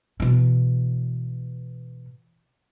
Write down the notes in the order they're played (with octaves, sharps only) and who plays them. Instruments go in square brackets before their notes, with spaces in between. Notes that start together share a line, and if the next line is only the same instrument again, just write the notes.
[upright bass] B2 E3